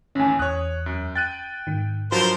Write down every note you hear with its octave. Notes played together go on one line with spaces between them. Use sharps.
A1 D#2 C#4 G#5
E2 C#5 D#6 F#6
F#2
G5 F#6 A6 D#7
G#2 D#3
G2 F3 F#3 F#4 A#4 C5